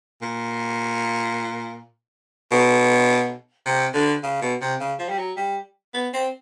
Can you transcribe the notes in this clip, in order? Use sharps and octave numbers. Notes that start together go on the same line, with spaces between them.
A#2
B2
C3
D3
C#3
B2
C3
C#3
F3
G3
F#3
G3
B3
C4